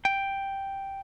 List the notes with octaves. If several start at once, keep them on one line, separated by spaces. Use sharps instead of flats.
G5